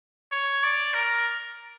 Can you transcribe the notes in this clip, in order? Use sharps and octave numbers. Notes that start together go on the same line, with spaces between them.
C#5
D5
A#4